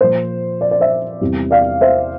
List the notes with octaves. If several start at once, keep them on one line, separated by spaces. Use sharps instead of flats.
A#2 F3 C5
D5
D5
C5 E5
E2 C3 G3
D5 F5
C5 E5